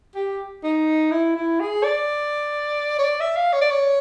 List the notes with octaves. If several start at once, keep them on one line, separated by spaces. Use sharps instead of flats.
G4
D#4
E4
E4
G#4
D5
C#5
D5
E5
F5
C#5
D5
C#5